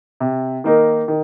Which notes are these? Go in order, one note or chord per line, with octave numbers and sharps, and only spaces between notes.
C3
D#3 A#3 D#4 A#4
D#3